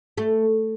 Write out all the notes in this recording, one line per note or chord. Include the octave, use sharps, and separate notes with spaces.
A3